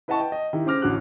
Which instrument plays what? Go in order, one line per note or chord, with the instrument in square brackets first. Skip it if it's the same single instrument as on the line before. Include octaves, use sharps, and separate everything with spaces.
[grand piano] E4 B4 D#5 F#5 A5 C#6
G5
D#5
D#3 E4 G4
C#3 C5 D6 F6 A#6
A1 A2 D3 F#4 D6 F#6